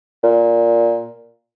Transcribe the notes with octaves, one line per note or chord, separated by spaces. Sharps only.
A#2